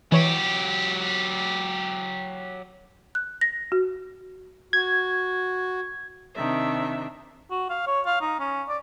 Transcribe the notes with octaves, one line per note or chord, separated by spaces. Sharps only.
E3 F#3 G4 C#5
F#6
A#6
F#4
F#4 G#6
C3 D#3 D4 E5
F#4
F5
C#5
F5
D#4
C#4
D5